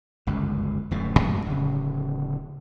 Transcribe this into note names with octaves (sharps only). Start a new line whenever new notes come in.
G1 C#2 F#2
D1 F#2 A2 A3
F#2 A2 F#3 G#3
D1 C#3